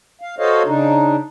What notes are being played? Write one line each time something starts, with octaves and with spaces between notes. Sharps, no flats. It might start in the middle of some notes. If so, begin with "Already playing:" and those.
F5
F#4 A4 C5 C#5 D#5 F5
C#3 D4 D#4